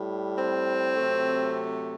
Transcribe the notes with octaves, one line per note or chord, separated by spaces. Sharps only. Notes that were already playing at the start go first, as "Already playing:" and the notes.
Already playing: A2 G3
C4
C3 F#3 A3